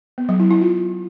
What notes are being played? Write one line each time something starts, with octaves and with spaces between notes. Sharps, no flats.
B3
F#3
E4
E4
F4